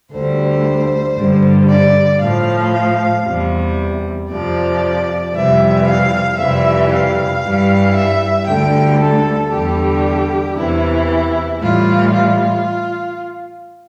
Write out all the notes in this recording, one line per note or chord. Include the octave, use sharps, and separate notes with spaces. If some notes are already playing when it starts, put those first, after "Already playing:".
D2 D3 G3 C5
G2 D3 G3
D5
A2 F3 F5
F5
E2 C3 G3
F2 C3 F3 D5
F2 C3 E3 G3 E5
F5
F2 C3 E3 G3 E5
F5
G2 E3 G3
E5
D2 D3 G3 G5
A4
E2 D3 G3 G4
E2 C3 E3 E4
A2 E3 G3 F4
F4